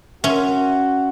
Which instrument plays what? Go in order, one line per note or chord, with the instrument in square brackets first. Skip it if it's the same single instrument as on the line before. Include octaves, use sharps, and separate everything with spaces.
[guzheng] C#4 [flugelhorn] F#4 [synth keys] E5 C6